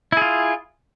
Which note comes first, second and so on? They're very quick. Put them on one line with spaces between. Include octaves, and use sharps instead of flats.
E4 G#4 F4